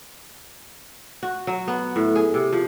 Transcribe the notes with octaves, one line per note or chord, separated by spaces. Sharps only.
F#4
F#3
B3
A2
G#4
C3
F3